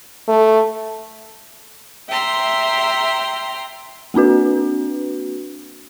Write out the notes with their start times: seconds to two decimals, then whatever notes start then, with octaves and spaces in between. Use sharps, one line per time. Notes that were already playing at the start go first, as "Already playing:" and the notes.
0.28 A3
2.09 E5 G5 A#5 C6
4.14 A#3 C4 D4 F#4 B4